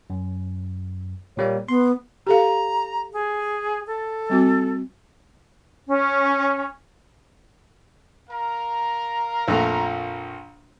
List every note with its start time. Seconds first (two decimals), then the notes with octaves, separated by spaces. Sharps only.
0.10 F#2
1.37 A#2 G3 A#3 C#5
1.68 B3 C6
2.27 G4 A4 F5 A#5
3.13 G#4
3.87 A4
4.30 G3 C4 F#4
5.87 C#4
8.30 A#4 F5 A#5
9.48 A#1 F2 A3